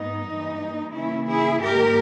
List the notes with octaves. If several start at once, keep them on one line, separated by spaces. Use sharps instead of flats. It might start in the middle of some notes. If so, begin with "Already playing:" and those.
Already playing: G#2 B3 D#4
G2 E3 G3 A#3
C#3 E3 A#3 C#4 E4
E4 G#4
G#2 D#3 A#3 G4 A#4